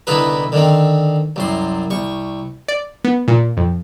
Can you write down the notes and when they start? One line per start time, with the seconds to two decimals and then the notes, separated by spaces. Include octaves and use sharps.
0.07 C2 D3 B3 D#4 E4 B4
0.52 D3 D#3 C4
1.36 C2 F#2 C6
1.91 C2 C#6
2.68 D5
3.04 B3
3.28 A#2
3.57 F2